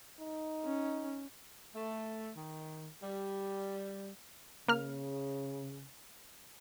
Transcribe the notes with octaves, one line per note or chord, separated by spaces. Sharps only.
D#4
C#4
A3
D#3
G3
C#3 A#3 F6